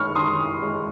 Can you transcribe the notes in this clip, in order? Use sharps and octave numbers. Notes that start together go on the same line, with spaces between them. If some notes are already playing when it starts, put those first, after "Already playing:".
Already playing: D#3 G#3 C#6 F6
D#3 C6 D#6
G#3